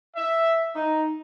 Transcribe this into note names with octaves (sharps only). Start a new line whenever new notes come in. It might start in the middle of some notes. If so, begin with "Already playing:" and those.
E5
D#4